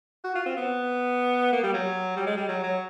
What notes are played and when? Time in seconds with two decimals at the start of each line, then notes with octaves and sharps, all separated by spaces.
0.24 F#4
0.35 F4
0.46 C4
0.57 B3
1.52 A#3
1.63 G3
1.74 F#3
2.16 G3
2.26 G#3
2.37 G3
2.48 F#3
2.63 F#3